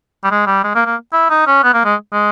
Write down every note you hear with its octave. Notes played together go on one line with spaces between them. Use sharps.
G3
G#3
G3
G#3
A#3
A#3
E4
D#4
C#4
B3
A#3
G#3
G#3